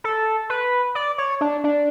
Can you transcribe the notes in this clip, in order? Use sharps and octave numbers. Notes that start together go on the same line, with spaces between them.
A4
B4
D5
C#5
D4
D4